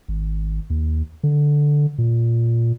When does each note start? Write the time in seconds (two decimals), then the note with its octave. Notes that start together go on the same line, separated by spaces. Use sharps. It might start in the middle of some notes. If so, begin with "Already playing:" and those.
0.08 G#1
0.70 D#2
1.23 D3
1.98 A#2